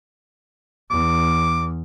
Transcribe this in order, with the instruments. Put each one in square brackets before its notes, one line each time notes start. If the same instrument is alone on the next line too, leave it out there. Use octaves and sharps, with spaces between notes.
[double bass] E2 [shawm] D6